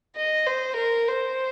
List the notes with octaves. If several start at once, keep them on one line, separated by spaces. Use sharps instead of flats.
D#5
C5
A#4
C5